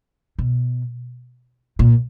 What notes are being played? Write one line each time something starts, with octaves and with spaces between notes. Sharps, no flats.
B2
A#2